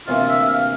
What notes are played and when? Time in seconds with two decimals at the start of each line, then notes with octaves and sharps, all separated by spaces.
0.07 D2 C3 E3 A#3 F4
0.28 E5
0.49 F5